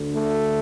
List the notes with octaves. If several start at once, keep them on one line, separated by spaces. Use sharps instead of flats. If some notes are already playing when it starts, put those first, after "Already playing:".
Already playing: D2 D3
A3